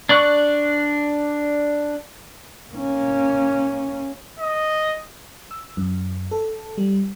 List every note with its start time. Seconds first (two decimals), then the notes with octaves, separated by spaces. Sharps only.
0.09 D4 D5 C#6 F#6
2.72 A#3 C#4
4.39 D#5
5.51 E6
5.77 F#2
6.31 A4
6.78 G3